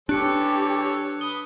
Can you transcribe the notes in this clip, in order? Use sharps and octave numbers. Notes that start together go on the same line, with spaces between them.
E3 D4 G4 A4 C#5 F#6 C#7
B4 D#6 G7